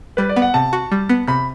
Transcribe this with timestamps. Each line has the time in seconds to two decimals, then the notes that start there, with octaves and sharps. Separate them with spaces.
0.17 G3 B4
0.29 D5
0.36 B3
0.42 F#5
0.54 C3 A5
0.73 F#4
0.92 G3
1.09 B3
1.27 C3 B5